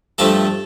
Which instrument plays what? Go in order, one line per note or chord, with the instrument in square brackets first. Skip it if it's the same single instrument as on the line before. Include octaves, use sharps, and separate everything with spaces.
[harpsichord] G2 F3 A3 A4 A5